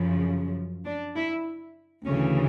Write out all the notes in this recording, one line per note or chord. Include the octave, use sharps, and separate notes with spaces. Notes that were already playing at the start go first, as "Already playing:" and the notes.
Already playing: F#2 C#3 F3
D4
E4
D2 C#3 E3 C#4